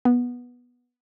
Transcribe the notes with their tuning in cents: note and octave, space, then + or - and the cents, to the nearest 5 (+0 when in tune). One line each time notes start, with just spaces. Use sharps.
B3 -10